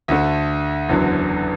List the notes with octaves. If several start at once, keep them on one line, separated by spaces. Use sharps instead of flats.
D2 D3 A3
F#1 E2 D3 F#3